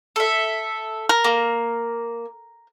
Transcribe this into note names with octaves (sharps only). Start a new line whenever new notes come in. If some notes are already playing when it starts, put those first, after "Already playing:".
A4 E5
A#4
A#3